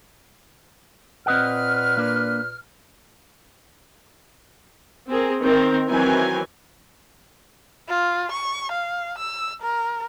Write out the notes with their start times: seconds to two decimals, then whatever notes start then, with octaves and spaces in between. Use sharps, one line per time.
1.26 A#2 C4 B4 D#5 F#5 F6
1.97 A#3 D4
5.09 C4 G#4 A#4
5.43 D#3 C4 A#4
5.87 D#3 E3 F#3 C4 G#5
7.89 F4
8.32 C#6
8.72 F5
9.18 E6
9.62 A#4